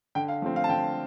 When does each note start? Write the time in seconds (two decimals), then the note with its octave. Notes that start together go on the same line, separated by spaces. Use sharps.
0.15 D3 G5
0.28 F5
0.42 F3 A3 C4
0.56 F5
0.64 A5
0.69 D3 G5